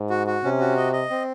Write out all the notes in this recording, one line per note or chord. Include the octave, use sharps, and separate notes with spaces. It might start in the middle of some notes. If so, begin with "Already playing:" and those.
Already playing: G#2
F#4
F#4
C3 C#4
F#4
D#5
D#5
C4